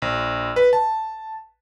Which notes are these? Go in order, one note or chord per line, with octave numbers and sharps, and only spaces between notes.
A#1
B4
A5